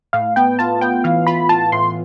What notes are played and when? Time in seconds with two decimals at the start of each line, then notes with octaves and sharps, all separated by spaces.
0.13 A2 F5
0.36 B3 G5
0.59 F4 A5
0.81 B3 G5
1.04 E3 F5
1.27 F4 B5
1.49 F4 A5
1.72 A2 C6